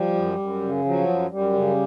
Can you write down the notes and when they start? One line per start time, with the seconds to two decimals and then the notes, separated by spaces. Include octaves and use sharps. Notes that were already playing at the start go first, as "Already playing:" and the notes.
Already playing: F3 G3
0.15 F#2
0.39 F#2
0.62 C#3
0.85 F3 F#3
1.08 F#2
1.30 F#2 G3
1.53 C#3